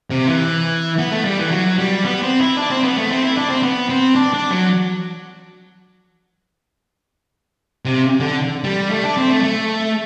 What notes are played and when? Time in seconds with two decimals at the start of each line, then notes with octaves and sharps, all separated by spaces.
0.10 C3
0.28 E3
0.99 B3
1.12 A3
1.25 G3
1.38 E3
1.51 F#3
1.78 G3
2.05 B3
2.23 C4
2.40 E4
2.57 D4
2.70 C4
2.83 B3
2.97 A3
3.10 C4
3.23 E4
3.36 D4
3.49 C4
3.63 B3
3.89 C4
4.15 D4
4.34 D4
4.51 F#3
7.85 C3
8.20 D3
8.64 G3
8.91 A3
9.04 D4
9.17 C4
9.30 A3
9.43 A3